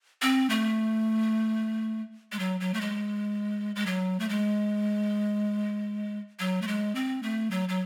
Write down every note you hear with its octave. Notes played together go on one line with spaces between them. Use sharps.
C4
A3
G#3
F#3
F#3
A3
G#3
G#3
F#3
A3
G#3
F#3
A3
G#3
C4
A3
F#3
F#3